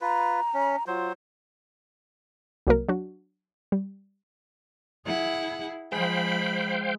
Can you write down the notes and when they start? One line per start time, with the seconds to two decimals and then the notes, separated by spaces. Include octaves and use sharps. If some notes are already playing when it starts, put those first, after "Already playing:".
0.01 F4 B4 A#5
0.54 C#4
0.87 F#3 F4 C5
2.67 C2 F#3 A#3 A#4
2.89 F#3 D4 F#4
3.72 G3
5.06 E4 G#4 F#5
5.92 F3 G#3 C5 F5 G5 B5